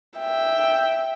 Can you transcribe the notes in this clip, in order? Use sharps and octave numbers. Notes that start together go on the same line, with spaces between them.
E5 G5